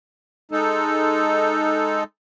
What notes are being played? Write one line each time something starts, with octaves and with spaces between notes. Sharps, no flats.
G#3 D#4 A4